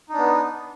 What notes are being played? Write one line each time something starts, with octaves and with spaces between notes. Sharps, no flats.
B3 D4 D#4